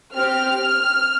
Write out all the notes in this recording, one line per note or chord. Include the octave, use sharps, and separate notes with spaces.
C4 G4 F6